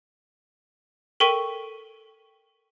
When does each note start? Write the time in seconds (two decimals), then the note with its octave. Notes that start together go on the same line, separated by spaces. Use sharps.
1.20 A4 A#4 G5 C#6 B6 D#7